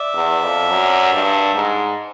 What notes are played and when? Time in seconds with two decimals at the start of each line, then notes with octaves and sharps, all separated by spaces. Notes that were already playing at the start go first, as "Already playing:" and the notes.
Already playing: D5 E5
0.15 E2
0.43 F2
0.70 F#2
1.13 G2
1.55 G#2